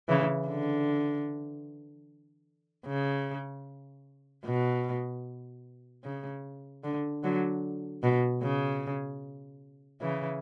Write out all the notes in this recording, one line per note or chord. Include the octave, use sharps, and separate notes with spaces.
C#3 E3
D3
C#3
B2
C#3
D3
D3 F#3
B2
C#3
C#3 E3